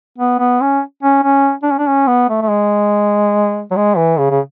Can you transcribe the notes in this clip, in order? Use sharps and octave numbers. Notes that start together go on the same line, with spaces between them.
B3
B3
C#4
C#4
C#4
D4
C#4
D4
C#4
B3
A3
A3
G#3
F#3
G#3
E3
C#3
C#3